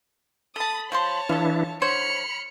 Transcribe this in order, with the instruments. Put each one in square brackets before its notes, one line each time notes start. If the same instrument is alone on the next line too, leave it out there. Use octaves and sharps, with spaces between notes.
[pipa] A4 A5 [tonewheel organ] B5 [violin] D#6
[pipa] F3 C5 C6 [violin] C#5 A5
[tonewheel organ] E3 D4 E4 [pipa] F4 A4
[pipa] D3 C5 C#5 [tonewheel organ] B5 [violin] F6 C#7